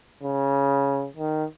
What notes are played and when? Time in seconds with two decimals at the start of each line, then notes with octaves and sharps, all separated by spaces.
0.23 C#3
1.17 D#3